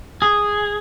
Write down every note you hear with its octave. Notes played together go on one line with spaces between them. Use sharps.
G#4